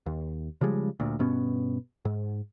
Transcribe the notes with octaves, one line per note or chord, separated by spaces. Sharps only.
D#2
C#3 F3 G3 G#3
D2 A#2
G2 B2 B3 C#4
G#2